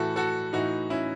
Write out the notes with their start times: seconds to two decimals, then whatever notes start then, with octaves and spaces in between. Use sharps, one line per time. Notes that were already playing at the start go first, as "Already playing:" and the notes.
Already playing: A2 E3 F#4 A4
0.16 F#4 A4
0.53 A2 E3 D#4 F#4
0.90 C#4 E4